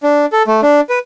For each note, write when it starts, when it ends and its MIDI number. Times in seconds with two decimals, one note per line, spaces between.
0.03 0.26 62
0.33 0.43 69
0.47 0.61 57
0.63 0.81 62
0.89 0.99 71